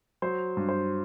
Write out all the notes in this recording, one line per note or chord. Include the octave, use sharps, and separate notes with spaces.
F#3 C5
G2
C5